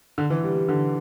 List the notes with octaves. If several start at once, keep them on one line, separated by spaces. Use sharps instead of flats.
D3
E3
G3
G3
D3